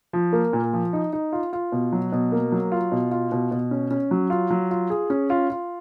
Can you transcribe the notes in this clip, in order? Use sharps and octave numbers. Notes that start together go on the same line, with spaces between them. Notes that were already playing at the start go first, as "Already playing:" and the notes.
F3
A#3
A#2
F3
D#4
D#4
F4
F4
B2
F#3
B2
A#3
F#3
F4
B2
F4
B2
B2
C#4
C#4
F#3
F4
F#3
F4
G#4
C#4
F4
F4